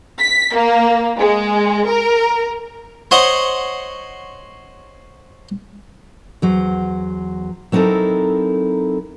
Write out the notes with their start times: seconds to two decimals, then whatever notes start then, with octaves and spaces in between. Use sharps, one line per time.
0.21 B6
0.55 A#3
1.19 G#3
1.89 A#4
3.11 C5 C#5 D#5 F#5 C6
6.42 E2 F#3 C5
7.72 F#3 C4 D#4 E4 A4 A#4